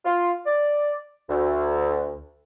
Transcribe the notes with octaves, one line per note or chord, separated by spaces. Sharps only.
F4
D5
D2